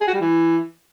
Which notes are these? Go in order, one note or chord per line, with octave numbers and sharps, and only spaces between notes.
G#4
F#4
G3
E3